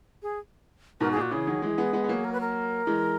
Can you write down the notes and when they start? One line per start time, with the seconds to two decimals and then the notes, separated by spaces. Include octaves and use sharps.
0.22 G#4
1.00 G#2 B2 A#4
1.12 A#2 G#4
1.21 F#4
1.31 C#3 E3 G#4
1.47 D#3 F#3
1.62 E3 G#3
1.78 G#3 B3
1.93 G#3 B3
2.04 B3
2.09 F#3 A#3
2.24 A#4
2.33 B4
2.41 A#4
2.87 E3 G#3